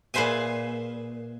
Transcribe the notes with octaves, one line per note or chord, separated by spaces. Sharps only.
A#2 G#4 B4 C5 E5 G#5